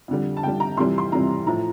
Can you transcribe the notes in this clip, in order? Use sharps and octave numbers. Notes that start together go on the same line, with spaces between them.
F2 D3 G3
A5
F2 D3 G3 G5
A#5
F2 C3 E3 G3 C6
C6
F2 C3 E3 G3 A#5
A2 F3 A#5